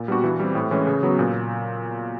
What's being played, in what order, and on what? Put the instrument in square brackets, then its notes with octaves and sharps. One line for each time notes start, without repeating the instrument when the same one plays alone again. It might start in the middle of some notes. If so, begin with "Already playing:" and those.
Already playing: [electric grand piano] A#2
G3 B3 D4 F#4
E3
G3 C4
A2
E3 G#3 C#4
C#3
F#3 B3
A#2